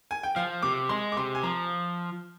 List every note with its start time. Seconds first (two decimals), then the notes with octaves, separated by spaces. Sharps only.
0.11 G#5
0.23 G5
0.36 F3 F5
0.62 C3 D6
0.89 G#3 C6
1.12 D6
1.17 C3 C6
1.35 G#5
1.43 F3 A#5